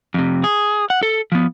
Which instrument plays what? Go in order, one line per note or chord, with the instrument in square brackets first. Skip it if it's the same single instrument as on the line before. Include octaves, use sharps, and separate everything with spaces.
[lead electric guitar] F2 C3
G#4
F#5
A4
F3 B3